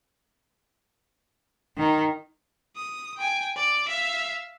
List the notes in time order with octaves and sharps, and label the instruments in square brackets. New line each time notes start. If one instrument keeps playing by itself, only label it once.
[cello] D#3
[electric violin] D#6
G5 G#5
D5
E5 F5